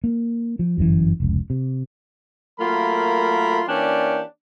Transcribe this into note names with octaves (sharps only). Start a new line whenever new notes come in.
A#3
F3
G1 F#2 C3 E3
F1 C#2
C3
F#3 A3 A#3 F4 A#4 B5
E3 A#3 C#4 D4 G4 D5